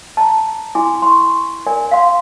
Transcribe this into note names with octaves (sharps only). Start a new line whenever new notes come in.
A5 A#5
E4 G#5 C6 D6
C6 C#6
A#4 D5 G#5
F5 F#5 C6